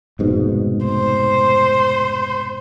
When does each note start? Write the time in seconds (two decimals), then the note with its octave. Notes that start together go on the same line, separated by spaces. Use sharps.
0.19 F1 G#2 B2
0.85 C5